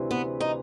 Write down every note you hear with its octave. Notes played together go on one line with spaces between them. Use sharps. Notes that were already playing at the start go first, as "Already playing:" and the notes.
Already playing: D2 C3 E3
B3
D#4